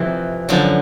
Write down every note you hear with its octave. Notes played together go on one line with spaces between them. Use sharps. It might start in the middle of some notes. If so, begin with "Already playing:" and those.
Already playing: F2 C3 E3
F#2 D3 F3